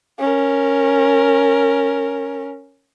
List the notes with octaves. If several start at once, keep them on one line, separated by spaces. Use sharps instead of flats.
C#4 A#4